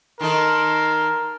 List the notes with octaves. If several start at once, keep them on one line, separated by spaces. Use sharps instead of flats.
D#3 D#4 A4 A#4 C6